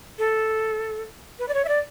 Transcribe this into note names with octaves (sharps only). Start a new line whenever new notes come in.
A4
B4
D5
C#5
E5
D5